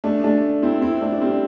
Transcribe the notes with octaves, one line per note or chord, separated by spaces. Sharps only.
A3 D4
A3 D4
C4 E4
C4 E4
A3 D4
D4
G3 C4